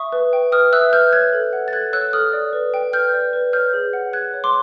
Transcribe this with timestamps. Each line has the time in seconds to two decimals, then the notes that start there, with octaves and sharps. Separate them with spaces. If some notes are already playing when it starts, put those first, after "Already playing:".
Already playing: E5 C#6 D#6
0.12 B4
0.33 G5
0.52 B4 D#6 F6
0.73 E5 E6 F#6
0.93 B4 F6 G6
1.13 C#5 F#6 G#6
1.33 A4
1.53 F#5
1.68 A6
1.73 A4 F#6 G#6
1.93 C#5 E6 F#6
2.13 A4 D#6 F6
2.33 D5
2.53 B4
2.74 G5
2.93 B4 F6 G6
3.13 D5
3.33 B4
3.53 C#5 F6 G6
3.73 G#4
3.93 F#5
4.13 G#4 F#6 G#6
4.34 C#5
4.44 C6 D6